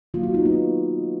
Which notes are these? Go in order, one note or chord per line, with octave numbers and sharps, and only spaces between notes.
D#3 F#3 A#3 F4
F#4
D#4
B3